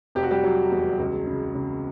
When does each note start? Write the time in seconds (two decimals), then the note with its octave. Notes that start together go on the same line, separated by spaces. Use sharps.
0.15 F1 G4
0.23 F#4
0.31 G3 G4
0.43 F#3
0.72 E2
1.00 C#2
1.27 C#3
1.55 C#3